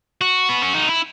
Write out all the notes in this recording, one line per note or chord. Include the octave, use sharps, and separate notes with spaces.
F#4
B3
C#4
D#4
E4